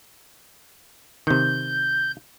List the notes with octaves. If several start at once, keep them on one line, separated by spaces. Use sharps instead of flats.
C3 D#3 G6